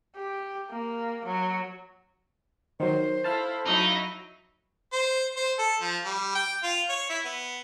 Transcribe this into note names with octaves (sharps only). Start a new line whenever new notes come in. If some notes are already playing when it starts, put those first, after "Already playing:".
G4
A#3
F#3
D#3 F#3 C5
E4 A4 F5 A5
F#3 D#4 E4
C5
C5
A4
F3
G3
G5
F4
C#5
E4
B3